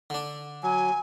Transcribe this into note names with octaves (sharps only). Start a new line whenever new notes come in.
D3 D4
F#3 G#5